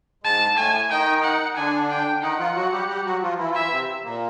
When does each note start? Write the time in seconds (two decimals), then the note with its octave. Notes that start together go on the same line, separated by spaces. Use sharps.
0.23 G#2 G#3 A5
0.57 A2 A3 G#5
0.90 D#3 D#4 G5
1.23 F#5
1.56 D3 D4 G#5
1.90 G5
2.22 D#3 D#4 F#5
2.39 F3 F4
2.55 F#3 F#4
2.72 G3 G4
2.89 G3 G4
3.06 F#3 F#4
3.22 F3 F4
3.39 E3 E4
3.50 F4
3.55 E3 E4 E5
3.72 C3 C4
4.04 A#2 A#3